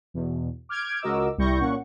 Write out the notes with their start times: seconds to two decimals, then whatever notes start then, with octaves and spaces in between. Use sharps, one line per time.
0.14 E2 B2
0.69 D6 F6 G6 G#6 D7
1.02 C#2 F#4 A#4 D#5 D6 E6
1.38 C2 G3 E4 C#6 G6 A#6
1.60 A#2 C#4 F#5 C#6